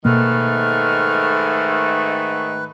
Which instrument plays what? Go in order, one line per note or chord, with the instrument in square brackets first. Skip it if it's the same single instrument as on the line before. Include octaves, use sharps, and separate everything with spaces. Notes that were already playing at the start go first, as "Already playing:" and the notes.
[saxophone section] G#2 D#3 A3 [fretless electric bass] B2 A#3 [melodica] B4 [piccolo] F6